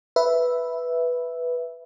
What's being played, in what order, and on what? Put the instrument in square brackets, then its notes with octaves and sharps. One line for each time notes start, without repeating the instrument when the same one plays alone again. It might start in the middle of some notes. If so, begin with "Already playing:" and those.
[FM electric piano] B4 E5